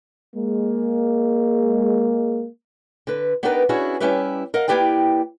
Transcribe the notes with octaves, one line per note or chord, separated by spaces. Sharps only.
G#3 A#3
D3 B4
B3 D4 D#4 G4 A#4 B4
B3 C#4 D4 E4 F#4 G#4
G3 C#4 E4 G4 B4 E5
A#4 D#5 F5 F#5
A#3 E4 G4 B4 D5 G5